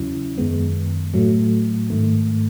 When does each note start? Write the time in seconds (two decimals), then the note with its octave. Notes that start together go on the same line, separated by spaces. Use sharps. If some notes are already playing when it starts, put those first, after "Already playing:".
Already playing: E2 C#3 F#3 C#4 E4
0.38 F#2 D#3 G#3 B3
1.14 A2 F#3 A3
1.90 G#2 D#3 A3